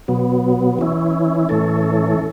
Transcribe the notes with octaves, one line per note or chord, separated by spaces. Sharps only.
B2 F#3 B3
E3 C#4 E4
A2 E3 A3 C#4 A4